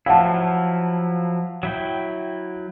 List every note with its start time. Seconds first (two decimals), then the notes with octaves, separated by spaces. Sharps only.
0.06 F3 F#3 E4 F5 F#5 A5
1.63 F#3 E4 G5